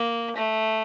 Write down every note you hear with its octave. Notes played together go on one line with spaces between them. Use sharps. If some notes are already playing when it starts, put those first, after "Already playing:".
Already playing: A#3
A3